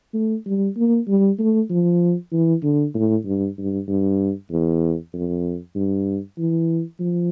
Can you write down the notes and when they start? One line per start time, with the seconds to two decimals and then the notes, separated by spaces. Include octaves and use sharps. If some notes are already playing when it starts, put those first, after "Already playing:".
0.14 A3
0.46 G3
0.77 A#3
1.08 G3
1.39 A3
1.70 F3
2.32 E3
2.63 D3
2.94 A2
3.25 G2
3.58 G2
3.88 G2
4.51 E2
5.13 F2
5.75 G2
6.38 E3
7.00 F3